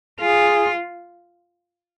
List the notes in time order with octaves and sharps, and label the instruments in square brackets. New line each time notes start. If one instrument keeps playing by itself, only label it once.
[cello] F4 [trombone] G#4